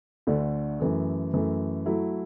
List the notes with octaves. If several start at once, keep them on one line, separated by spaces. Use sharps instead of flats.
D2 D3 A3
F#2 E3 A3
F#2 E3 A3
F#3 A3 E4